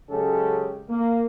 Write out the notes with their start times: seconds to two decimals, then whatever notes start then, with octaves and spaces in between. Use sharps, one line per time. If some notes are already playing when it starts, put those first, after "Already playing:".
0.10 F#2 C#3 G#3 C#4 G4 A4
0.89 A#3